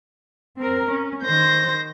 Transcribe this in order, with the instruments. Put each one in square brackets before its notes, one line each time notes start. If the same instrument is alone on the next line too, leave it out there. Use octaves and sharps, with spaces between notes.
[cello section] C4 A#4
C#4
[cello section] D#3 C5 [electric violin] G6 A#6